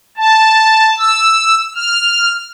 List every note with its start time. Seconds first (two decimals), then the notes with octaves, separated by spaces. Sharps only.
0.17 A5
0.98 E6
1.75 F6